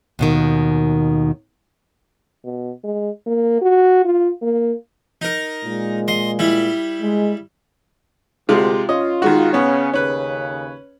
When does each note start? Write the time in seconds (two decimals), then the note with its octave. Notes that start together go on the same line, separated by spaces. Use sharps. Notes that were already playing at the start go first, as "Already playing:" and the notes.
0.19 D#2 B2 D#3
2.45 B2
2.84 G#3
3.27 A#3
3.62 F#4
4.05 F4
4.42 A#3
5.22 D#4 A#4
5.64 A#2 G#3
6.08 D#5 C6
6.39 G3 E4
7.00 G#3
8.49 D2 C3 G#3 F4
8.89 C#4 F4 D#5
9.22 D#3 G#3 F#4
9.53 C#3 B3 C#4 C#5
9.93 D#2 C#3 C#4 B4